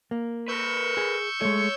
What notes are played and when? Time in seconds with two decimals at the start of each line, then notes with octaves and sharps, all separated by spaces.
0.11 A#3
0.48 A#4 B4 C#6 E6 G6
0.97 G#4
1.42 G#3 A3 C#5